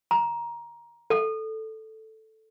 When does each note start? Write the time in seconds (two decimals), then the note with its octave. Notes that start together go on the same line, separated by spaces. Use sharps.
0.11 A#5
1.10 A4